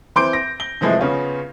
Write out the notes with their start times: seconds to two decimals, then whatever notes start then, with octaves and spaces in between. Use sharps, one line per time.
0.16 E3 C4 C6 D6 G6 D7
0.33 A#6
0.60 G7
0.81 C3 E3 F3 G#3 A3
0.99 C#3 B3 C#4 F4